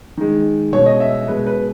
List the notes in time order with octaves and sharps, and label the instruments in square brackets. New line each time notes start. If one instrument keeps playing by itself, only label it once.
[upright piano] D#3 G#3
B2 G#3 C#5
D#5
E5
B2 G#3 B4
B4